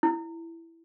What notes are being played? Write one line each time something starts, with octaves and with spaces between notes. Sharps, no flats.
E4